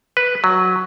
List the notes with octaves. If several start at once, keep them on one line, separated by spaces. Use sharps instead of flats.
B4
F#3